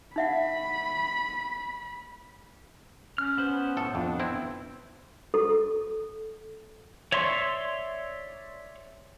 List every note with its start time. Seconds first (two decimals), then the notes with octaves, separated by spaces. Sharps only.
0.16 D#4 E5 F#5 B5
3.18 C#4 F6
3.37 B3 B4 C5
3.77 A2 A4
3.95 F2 D4
4.20 C4 E4
5.34 A4
7.12 C#5 D5 E5 C6 C#6